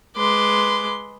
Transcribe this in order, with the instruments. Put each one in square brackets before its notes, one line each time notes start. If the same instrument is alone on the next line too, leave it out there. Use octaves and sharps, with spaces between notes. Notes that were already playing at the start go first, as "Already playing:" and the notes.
[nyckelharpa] G#3 D6 [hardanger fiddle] B4 C6